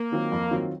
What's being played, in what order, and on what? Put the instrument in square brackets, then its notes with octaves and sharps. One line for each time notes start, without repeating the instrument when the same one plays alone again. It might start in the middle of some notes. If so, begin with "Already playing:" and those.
Already playing: [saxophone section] A#3
[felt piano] D#3 F#3 C4 F4
F2
D#3 F#3 C4 F4